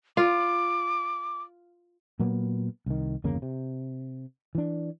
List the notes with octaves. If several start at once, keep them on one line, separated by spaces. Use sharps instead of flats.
F4 D6
A#2 F#3 A#3 B3
C2 D#3
G1 E2 C#3 A#3
C3
E3 D4